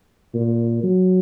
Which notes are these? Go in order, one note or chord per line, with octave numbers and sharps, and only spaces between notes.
A#2
F#3